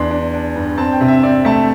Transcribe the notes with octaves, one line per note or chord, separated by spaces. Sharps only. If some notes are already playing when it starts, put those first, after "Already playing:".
Already playing: E2 D4 C6
D4
D4
G2
C4 A5
G5
C3
E5
C4 D5
A3 A5